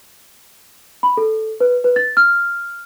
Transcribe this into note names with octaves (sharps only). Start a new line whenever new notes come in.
B5
A4
B4
B4
A6
F6